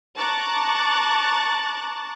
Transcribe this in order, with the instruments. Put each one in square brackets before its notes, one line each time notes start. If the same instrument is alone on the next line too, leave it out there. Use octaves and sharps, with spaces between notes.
[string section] A5 A#5 C#6 D6 F#6 A6